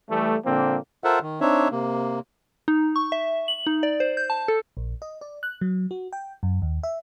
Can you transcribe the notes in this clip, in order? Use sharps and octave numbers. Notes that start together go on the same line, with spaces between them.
E3 G3 A3
A#2 D3 F3 A#3 C4
F4 A4 A#4 C5 E5 F#5
D#3
C4 D4 D#4 C#5 E5
C3 A#3
D#4
C#6
E5
F#7
D#4
D5
C5
G6
A5
A4
A#1
D#5
D5
F#6
F#3
F#4
G5
F#2
D#2
E5